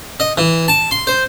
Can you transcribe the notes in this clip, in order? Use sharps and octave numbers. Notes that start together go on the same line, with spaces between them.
D#5
E3
A5
C6
C5